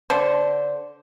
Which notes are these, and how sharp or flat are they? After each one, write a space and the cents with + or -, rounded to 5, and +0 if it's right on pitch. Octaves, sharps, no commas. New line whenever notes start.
D3 -15 C5 +0